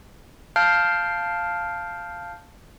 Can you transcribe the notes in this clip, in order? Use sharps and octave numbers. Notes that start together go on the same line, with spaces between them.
F5 A5 F6 G6 C7 D7